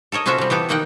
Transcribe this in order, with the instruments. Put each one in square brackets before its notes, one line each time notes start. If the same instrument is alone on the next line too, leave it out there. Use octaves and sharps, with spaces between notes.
[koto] A4 A#4 C#5 D#5
C3 C#4 F4 F#4 A4 E5
C3 G3
E3 B3 G4 A4
B2 D#3 A#3 D#4 F#5 G5